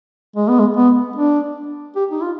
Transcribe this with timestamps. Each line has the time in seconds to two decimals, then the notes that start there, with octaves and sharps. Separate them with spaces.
0.36 G#3
0.48 B3
0.60 G#3
0.77 B3
1.16 D4
1.96 G4
2.11 D#4
2.23 F4